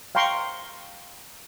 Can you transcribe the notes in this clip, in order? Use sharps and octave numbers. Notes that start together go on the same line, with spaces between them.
F5 G5 A#5 C6 C#6